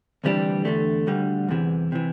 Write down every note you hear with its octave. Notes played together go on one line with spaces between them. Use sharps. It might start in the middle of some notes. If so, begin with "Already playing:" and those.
D2 C3 E3 G3 D4
E2 D3 A3
D2 D3 G3
E2 C3 E3
C3 E3